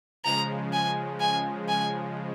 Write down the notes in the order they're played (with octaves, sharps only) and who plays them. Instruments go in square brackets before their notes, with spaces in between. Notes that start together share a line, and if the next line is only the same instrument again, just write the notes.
[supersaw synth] C#3 F3 G#3 [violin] A#5
[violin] G#5
G#5
G#5